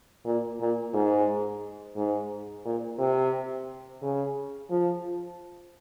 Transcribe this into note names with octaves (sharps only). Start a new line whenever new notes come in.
A#2
A#2
G#2
G#2
A#2
C3
C#3
F3